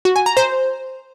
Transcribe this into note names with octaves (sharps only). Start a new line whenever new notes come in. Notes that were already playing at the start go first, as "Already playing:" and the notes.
F#4
G#5
A#5
C5